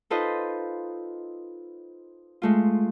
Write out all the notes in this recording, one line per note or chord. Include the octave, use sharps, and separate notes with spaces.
D#4 F4 A4 B4 C5 D#5
G#3 A3 F4